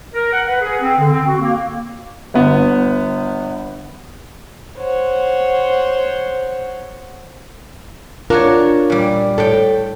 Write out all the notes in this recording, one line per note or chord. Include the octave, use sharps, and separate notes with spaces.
A#4
F#5
B4
G#4
C4
D3
C4
F#4
A#3
G1 B3
C5 C#5 F#5
D4 F4 F#4 A#4 C#5
A#2 G3
A2 A4 G5